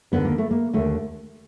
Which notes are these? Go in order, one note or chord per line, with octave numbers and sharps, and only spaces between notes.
D#2 D3 B3
A#3
A3
A#3
D#2 D3 A3